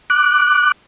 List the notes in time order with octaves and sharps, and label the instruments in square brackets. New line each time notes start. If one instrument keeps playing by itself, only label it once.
[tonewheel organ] D6 F#6